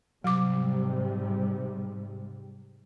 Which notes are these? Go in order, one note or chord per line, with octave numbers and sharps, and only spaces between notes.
G#2 C3 F#3 G3 D6